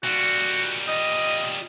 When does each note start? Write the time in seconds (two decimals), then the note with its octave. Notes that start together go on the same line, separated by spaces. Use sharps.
0.03 A#2 G3 F#4
0.88 D#5